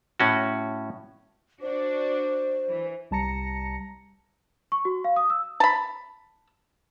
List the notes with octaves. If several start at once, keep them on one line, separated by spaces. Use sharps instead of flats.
A2 C#4 F#4
D4 F#4 C5
E3
C2 G3 A5 A#5 A#6 C#7
C#6
F#4
F5
D#6
E6
A5 B5